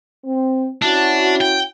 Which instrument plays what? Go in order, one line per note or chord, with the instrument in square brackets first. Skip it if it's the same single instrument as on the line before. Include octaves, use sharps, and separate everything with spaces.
[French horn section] C4
[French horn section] C#4 E4 F#4 [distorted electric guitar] D4
[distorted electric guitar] G5